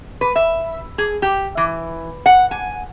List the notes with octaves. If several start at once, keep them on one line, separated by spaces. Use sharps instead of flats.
B4
E5
G#4
G4
E3
F#5
G#5